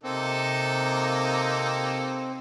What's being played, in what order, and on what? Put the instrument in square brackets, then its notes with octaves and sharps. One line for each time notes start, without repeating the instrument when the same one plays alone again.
[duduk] C3 [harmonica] A#3 D#4 A4 [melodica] C4